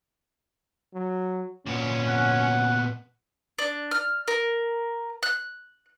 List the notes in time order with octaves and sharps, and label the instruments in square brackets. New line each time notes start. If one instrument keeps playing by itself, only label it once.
[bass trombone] F#3
[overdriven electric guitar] A#2 B3 [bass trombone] C#4
[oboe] F#5
[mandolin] D4
F6
A#4
F#6